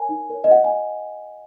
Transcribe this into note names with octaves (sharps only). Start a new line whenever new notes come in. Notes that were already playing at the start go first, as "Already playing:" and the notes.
Already playing: A#4 C#5 G#5
D#4
A#4 C#5
D#5
F#4 F#5
G#5